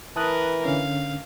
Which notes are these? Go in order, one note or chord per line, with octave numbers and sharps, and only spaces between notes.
E3 A#4 B4 A5 D#6 F#6
D3 C#4 F5